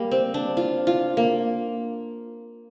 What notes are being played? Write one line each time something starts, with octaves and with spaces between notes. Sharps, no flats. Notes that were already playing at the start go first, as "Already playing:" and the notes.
Already playing: G3 A#3
C4
D4
F4
F4
A#3